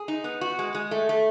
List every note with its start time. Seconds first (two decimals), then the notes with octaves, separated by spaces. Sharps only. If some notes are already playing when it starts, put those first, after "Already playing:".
Already playing: G#4
0.08 D#4
0.24 B3
0.41 F#4
0.59 G#3
0.75 G#3
0.91 A3
1.09 A3